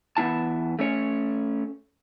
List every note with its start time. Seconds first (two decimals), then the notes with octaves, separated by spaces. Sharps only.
0.17 E2 B3 E4 A5
0.79 A3 C#4 C#5